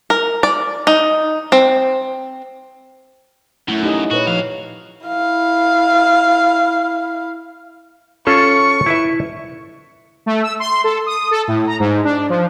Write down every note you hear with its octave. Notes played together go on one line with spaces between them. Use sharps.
A#4
D5
D#4
C4
F#2 A3 E4
D#4 G4 D#5
A#2 F#4 B4 C#5
F2 F3 F5
E4 F5
C#4 F4 A4 C#6
E4 B4 E5
A3
E6
C6
A4
D#6
A4
A2
A#5
G#2
D4
F3